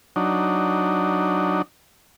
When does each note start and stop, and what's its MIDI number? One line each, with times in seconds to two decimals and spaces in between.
0.16 1.62 54
0.16 1.62 62
0.16 1.62 63